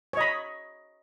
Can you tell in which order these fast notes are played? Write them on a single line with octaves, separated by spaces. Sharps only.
C#5 D#5 B5